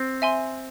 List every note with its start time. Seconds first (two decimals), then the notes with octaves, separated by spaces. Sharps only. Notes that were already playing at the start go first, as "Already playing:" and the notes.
Already playing: C4
0.22 E5 G#5 C6